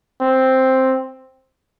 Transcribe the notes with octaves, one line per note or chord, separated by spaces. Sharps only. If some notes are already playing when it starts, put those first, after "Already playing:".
C4